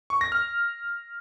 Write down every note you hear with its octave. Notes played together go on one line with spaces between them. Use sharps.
C#6
A#6
F6